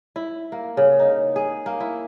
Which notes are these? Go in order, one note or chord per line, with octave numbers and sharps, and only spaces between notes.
E4
A#3
C#3
D#4
G#4
A#3
E4